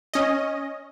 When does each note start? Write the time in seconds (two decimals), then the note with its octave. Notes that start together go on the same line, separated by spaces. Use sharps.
0.14 C#4 D#5